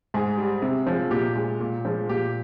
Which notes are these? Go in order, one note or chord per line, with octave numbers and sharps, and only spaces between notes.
G#2 G#4
G3
C3
F3 G#3
A#2 G4
G#3
A#2
F3 G#3
A#2 G4